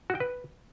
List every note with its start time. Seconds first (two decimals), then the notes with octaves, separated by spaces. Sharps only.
0.10 F#4
0.15 G5
0.20 B4